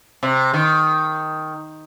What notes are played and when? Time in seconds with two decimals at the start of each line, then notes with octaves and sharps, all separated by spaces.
0.23 C3
0.53 D#3